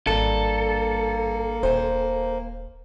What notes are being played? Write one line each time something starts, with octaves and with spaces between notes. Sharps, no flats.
G#1 G2 A#3 A4
D#1 C5 G#5